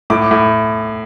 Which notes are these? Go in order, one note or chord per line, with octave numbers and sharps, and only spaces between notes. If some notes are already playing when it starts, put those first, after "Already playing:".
A2 D6
A2